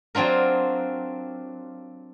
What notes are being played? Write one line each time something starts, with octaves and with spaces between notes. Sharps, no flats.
F#3 C4 D4 F4 A#4